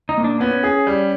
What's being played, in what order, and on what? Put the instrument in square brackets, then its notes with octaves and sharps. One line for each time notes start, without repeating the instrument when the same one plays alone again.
[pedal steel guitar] D#4
[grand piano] A#2
[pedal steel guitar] D4
[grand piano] B3 [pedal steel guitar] C#4
[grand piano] G#4
G3